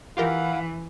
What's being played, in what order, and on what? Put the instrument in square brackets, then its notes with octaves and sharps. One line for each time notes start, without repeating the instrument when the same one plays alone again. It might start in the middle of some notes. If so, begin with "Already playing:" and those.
[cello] E3 [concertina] E4 F5 F#5 [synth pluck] F4 G4 A#4